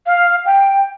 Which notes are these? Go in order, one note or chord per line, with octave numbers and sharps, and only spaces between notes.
F5
G5